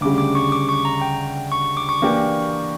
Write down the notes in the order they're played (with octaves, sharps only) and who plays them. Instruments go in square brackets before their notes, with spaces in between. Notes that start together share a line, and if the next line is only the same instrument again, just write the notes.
[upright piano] D2 C#3 G3 [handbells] D6
[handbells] D6
C#6
D6
C#6
A#5
G5
C#6
D6
C#6
[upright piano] E3 A#3 D4 G4 A#4